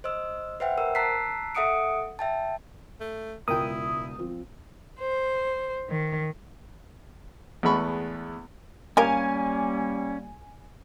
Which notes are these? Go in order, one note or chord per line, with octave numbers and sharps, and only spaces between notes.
C5 D#5 E6
B4 C5 E5 F#5 G5
A#4 C5 E6
A5 A#5 E6 F#6 B6 C7
A4 E5 F#5 D#6 C#7 D7
E5 G5 A5
A3
E1 C#2 E4 A#4 G5 D#6
F3 C4
C5
D#3
E2 G#3 A3 B3 B5 C#6
G3 A#3 C#4 G4 A#4 F5 G#5